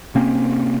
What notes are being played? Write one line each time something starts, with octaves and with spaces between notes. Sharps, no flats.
C3 A#3 C4 C#4